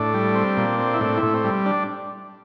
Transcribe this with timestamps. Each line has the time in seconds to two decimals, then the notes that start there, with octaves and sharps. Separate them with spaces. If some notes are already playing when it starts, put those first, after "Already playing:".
Already playing: A2 D4
0.14 G3
0.35 C4
0.57 A#2
0.79 C4
0.94 E4
1.01 A2 D4
1.17 E4
1.23 A2
1.34 C4
1.44 G3
1.66 D4